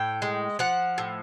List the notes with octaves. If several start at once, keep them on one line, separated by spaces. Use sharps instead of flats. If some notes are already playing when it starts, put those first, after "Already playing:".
Already playing: A2 G5
G#3
F3 F#5
A2